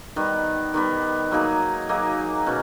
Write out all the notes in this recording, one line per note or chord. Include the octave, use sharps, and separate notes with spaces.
D#3 G3 B3
D#3 G3 B3
F#3 A#3 D#4 G#4
F#3 A#3 D#4 G#4
B2 C#4